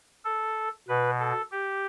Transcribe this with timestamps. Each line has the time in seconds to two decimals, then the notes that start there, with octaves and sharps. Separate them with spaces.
0.25 A4
0.88 B2 B4
1.20 A4
1.51 G4